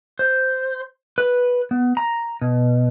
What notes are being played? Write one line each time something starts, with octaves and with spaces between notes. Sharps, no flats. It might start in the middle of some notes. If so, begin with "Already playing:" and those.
C5
B4
B3
A#5
B2